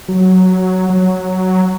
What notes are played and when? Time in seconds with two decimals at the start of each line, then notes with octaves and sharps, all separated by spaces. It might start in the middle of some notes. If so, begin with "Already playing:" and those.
0.08 F#3
0.90 F#3